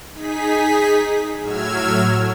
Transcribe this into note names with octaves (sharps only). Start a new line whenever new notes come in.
D#4 G#4 B6
A2 F#3 E6 F6 G#6